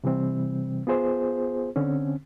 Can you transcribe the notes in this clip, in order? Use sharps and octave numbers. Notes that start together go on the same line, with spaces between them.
C3 E3 G3 C4
B3 F4 G#4 C5
D3 C4 C#4